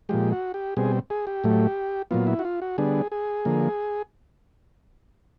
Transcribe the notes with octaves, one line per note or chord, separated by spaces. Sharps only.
A#2 F3 G#3 G4
F#4
G4
B2 G3 C4 G#4
G#4
G4
A2 F#3 A3
A#2 F#3 B3 F4
E4
F#4
F4
F#4
D3 G3 B3 D4 G#4
G#4
D3 F3 A#3